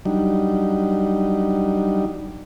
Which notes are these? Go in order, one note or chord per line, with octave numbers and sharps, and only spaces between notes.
F#3 G3 D4 D#4